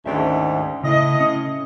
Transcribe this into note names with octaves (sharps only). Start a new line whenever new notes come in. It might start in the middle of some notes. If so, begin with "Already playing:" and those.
D2 G#2 D#3 C#4 D5 E5
A2 C#3 E4 D#5
C#4